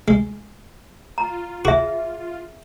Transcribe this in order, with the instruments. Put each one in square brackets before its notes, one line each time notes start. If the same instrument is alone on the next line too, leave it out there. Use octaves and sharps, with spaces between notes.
[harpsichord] G#3
[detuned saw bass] F4 [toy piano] A#5
[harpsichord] F#4 [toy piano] G#4 E5